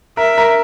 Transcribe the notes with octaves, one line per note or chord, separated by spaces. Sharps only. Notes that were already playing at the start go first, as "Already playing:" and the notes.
A#4 E5
A#4